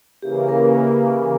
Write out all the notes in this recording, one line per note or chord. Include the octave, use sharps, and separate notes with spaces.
C#3 E3 A#3 G4
A#4